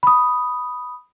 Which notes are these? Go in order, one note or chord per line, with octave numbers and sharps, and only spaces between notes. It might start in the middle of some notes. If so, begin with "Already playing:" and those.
B5 D#6